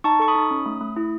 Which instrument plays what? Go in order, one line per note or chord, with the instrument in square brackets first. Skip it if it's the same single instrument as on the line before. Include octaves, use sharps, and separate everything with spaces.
[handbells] D#4 A5 C#6
A4 C#6
B5 D#6
D#4
C#4
A3
A3
E4